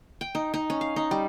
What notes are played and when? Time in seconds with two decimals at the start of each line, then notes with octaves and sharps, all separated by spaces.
0.21 G5
0.35 D#4
0.54 D#4
0.70 C#4
0.81 F5
0.96 D#4
1.11 G3